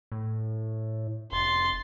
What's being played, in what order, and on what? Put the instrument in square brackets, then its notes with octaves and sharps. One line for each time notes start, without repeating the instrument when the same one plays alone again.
[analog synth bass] A2
[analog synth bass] F1 [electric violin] C6 A6